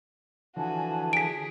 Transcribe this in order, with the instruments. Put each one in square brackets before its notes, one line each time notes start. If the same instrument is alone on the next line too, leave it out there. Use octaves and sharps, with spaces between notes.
[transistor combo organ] D3 E3 F3 [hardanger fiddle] F#4 [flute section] G#5 A5
[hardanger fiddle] G#4 [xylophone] B6 D7